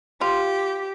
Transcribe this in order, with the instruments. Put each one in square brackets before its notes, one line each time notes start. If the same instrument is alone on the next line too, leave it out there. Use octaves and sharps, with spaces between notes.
[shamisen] F4 [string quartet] G4